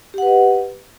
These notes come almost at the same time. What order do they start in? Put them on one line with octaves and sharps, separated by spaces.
G4 F#5 B4 D#5